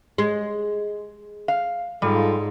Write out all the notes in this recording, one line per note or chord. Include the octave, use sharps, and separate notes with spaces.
G#3
F5
G#2 G3 F4 A4